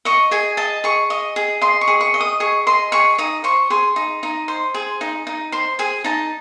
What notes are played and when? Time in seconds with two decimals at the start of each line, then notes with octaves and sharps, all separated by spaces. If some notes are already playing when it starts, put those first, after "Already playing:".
0.05 D#5 C#6
0.31 G#4 G#5
0.57 D#5 A5
0.84 G#4 C#6
1.10 D#5
1.36 G#4
1.61 D#5 C6
1.81 C#6
1.88 G#4
2.01 C#6
2.14 D#5
2.21 D#6
2.40 G#4 C#6
2.67 D#5 C6
2.92 G#4 C#6
3.18 D#4 D#6
3.44 C5 C#6
3.70 G#4 C6
3.96 D#4
4.23 D#4
4.48 C5
4.74 G#4
5.01 D#4
5.27 D#4
5.52 C5 C6
5.79 G#4 G#5
6.04 D#4 A5